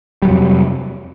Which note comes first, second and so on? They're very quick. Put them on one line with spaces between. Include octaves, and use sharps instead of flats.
G3 F#3 C3 F2